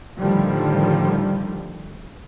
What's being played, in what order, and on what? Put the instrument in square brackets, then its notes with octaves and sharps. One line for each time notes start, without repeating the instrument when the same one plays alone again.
[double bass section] A2 D3 D#3 F3 G3